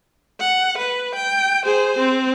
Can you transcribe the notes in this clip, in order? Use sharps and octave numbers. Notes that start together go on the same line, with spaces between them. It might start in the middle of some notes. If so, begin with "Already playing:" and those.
F#5
B4
G5
G#4 C5
C4